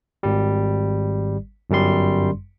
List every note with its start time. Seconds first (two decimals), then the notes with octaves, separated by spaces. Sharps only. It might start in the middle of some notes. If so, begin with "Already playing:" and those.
0.23 G#1 G3
1.70 G1 F#2 G3 C6